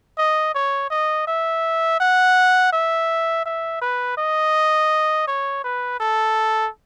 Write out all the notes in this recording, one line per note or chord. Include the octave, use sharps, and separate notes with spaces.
D#5
C#5
D#5
E5
F#5
E5
E5
B4
D#5
C#5
B4
A4